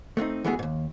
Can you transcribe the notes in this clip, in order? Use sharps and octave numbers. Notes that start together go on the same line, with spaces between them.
A3 B3 C4 D#4
E3 G#3 A3 B3 F#4 G#4
D#2 G#2